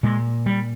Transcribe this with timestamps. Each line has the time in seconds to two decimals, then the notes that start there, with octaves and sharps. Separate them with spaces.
0.03 A#2 G#3
0.46 G3